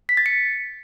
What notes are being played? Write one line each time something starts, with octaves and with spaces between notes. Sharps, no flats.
B6
A6
C#7